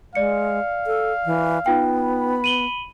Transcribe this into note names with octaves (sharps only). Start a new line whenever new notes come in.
G#3 D5 F5 C#7
A4
E3
B3 D#4 F4 G5
B5
D#7 F#7 G7